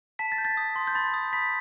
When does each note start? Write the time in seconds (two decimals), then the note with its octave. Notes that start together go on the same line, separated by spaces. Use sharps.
0.19 A5 B6
0.32 A6
0.38 G6
0.45 A6
0.57 D#6
0.76 C6
0.87 G6
0.95 B5 A6
1.14 D#6
1.33 B5 B6